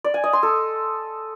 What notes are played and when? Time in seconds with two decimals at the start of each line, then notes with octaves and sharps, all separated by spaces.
0.04 D5
0.14 G#5
0.24 D#5
0.33 C6
0.43 A4